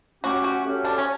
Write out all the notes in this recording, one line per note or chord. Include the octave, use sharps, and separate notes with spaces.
F#3 A3 C#4 F#4 G4
F#4
F#3 A3 C#4 G4
D4
C#4